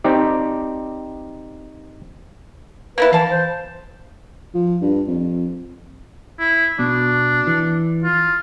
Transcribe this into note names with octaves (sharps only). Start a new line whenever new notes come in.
C4 D#4 G4 D5
A#3 B3 E4 B4
E3 F5 A5
C5
F3
G2
F2
E4
B2 D4
E3
F4